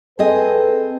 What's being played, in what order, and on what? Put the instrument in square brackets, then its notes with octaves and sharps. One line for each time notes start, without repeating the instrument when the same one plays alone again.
[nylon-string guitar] C4 G#4 D#5 [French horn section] A4 B4